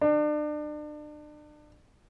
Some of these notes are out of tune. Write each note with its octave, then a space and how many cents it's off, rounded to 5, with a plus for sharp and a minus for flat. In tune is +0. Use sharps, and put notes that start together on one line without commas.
D4 +35